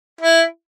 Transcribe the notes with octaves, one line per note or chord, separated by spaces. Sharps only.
E4